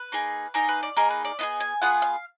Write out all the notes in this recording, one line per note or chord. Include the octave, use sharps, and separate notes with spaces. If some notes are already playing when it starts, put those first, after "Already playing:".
Already playing: B4
A#3 D#4 G#4
A#3 D#4 G#4 A#4
B4
D5
A#3 D#4 G#4 A#4
B4
D5
B3 F4 G#4 D#5
G#5
B3 F4 G#4 F#5
F5